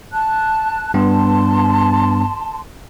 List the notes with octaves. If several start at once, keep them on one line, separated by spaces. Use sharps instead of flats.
A5 F#6
G2 B3 A5 C6